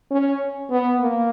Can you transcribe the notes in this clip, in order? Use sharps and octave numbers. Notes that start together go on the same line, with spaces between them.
C#4
B3
A#3